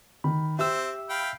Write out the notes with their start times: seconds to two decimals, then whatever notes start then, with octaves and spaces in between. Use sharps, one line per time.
0.24 D#3 B5
0.59 C4 G4 E5 E6
1.10 F5 G5 B5